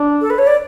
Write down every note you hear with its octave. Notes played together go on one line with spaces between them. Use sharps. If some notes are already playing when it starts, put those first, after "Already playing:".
Already playing: D4
A4
B4
C#5
D5